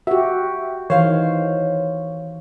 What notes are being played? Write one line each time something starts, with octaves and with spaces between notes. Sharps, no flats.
F#4 G4 E5
D#3 E3 C5 C#5 F5